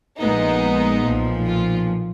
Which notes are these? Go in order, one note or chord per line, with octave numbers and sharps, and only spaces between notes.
A#1 A#2 G#3 B3 D#4
B1 A#2 F3
F4